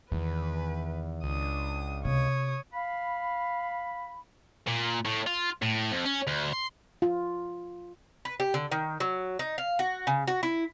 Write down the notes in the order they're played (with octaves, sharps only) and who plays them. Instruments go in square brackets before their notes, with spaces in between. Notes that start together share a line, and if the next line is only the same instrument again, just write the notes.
[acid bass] E2 [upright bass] D#3 [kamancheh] B4
[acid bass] C#2 [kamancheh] D4 D#6
[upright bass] C3 [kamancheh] C#5 D#6
[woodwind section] F5 B5
[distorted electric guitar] A#2
A2
F4
A2
F2
C#4
D2
C6
[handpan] F4
[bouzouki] B4
G4
D3
D#3
F#3
D#4
F5
F#4
C#3
F#4
E4